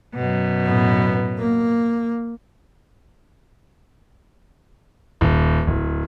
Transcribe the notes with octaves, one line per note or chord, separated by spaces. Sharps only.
F#2 B2
A2 B3
A#3
D#1
D1